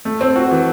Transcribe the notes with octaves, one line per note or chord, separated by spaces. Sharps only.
A3
C4
F#4
E3